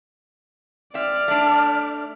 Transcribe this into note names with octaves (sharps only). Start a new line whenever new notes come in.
C4 D5 E5 F6
A3 D4